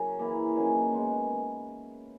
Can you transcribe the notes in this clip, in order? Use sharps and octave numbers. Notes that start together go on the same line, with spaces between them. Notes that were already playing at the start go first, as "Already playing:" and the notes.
Already playing: C#3 F#3 C#4 A#4
E3 A#3 E4
D#3 F#3 A#3 C#4
B2 G#3 B3